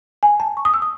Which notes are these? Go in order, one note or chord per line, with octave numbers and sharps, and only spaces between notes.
G#5
A5
C#6
D#6
E6
D#6